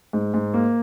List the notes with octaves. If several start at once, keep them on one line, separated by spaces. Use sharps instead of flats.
G#2
G#2
A#3